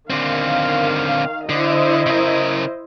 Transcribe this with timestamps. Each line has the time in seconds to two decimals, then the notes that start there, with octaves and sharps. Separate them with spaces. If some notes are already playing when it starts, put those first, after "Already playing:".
0.10 D3 D#3 C4 F5
1.49 D3 E4 C5 D#5
2.06 C#3 A#4